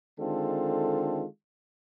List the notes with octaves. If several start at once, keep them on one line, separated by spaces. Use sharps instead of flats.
D3 D#3 G#3 C4 F4 A4